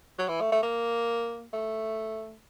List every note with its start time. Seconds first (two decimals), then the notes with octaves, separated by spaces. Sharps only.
0.18 F#3
0.28 E3
0.41 A3
0.52 A3
0.63 A#3
1.53 A3